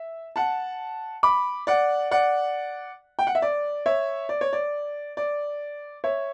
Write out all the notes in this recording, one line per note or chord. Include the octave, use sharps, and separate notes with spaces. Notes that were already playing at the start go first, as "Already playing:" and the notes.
Already playing: E5
F#5 A5
B5 D6
D5 F#5
D5 F#5
G5
F#5
E5
D5
C#5 E5
D5
C#5
D5
D5
C#5 E5